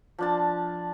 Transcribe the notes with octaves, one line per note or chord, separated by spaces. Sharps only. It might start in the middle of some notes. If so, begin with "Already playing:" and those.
F3 D4 A5